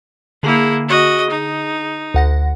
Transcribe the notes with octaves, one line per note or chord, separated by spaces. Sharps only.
D3 A#3 E4 G#4
F#4 D#5
D#4
D2 F#5 A#6